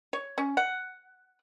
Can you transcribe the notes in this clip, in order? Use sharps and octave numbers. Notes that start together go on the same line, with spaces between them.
C#5
C#4
F#5